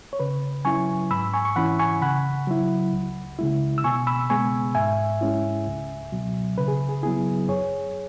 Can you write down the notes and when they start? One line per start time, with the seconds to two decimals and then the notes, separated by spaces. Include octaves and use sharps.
0.13 C#5
0.20 C#3 B4
0.65 F#3 C#4 E4 G#5 C#6
1.11 G#2 B5 E6
1.33 G#5 C#6
1.45 C#6
1.56 E3 C#4 E4 F#5 B5
1.79 G#5 C#6
2.02 C#3 F#5 B5
2.47 F#3 E4
2.93 C#2
3.39 C#3 G#3 E4
3.78 E6
3.84 B2 G#5 C#6
4.07 B5 E6
4.30 G#3 B3 G#5 C#6
4.75 G#2 E5 G#5
5.21 G#3 C#4 E4
5.67 C#2
6.12 B2 F#3
6.58 C#3 B4
6.68 G#4
6.89 G#4
7.03 F#3 B3 E4 G#4
7.49 F#2 G#4 C#5